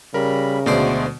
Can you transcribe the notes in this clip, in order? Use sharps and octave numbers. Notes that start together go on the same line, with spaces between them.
C#3 G3 A#4 B5
D2 B2 G#3 A3 B3 C5 D5